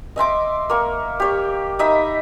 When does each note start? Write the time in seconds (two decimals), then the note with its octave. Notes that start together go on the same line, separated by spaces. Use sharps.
0.16 D#5 E5 C6 D6
0.70 A#3 C#6
1.20 G4 C#5
1.79 D#4 D#5 E5 B5